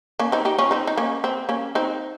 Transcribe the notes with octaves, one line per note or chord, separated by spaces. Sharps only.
A#3 C#4
C4 D#4
D#4 G4
C#4 F4
C4 D#4
D#4
A#3 C#4
C4
A#3 C#4
C4 D#4